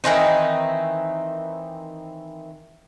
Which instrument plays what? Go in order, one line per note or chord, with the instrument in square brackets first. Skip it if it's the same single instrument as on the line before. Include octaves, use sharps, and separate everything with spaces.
[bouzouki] D#3 E3 C4 D#4